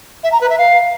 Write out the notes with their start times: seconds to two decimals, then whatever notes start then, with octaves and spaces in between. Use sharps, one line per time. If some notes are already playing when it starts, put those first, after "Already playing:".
0.23 E5
0.32 A#5
0.41 B4
0.50 E5
0.58 F5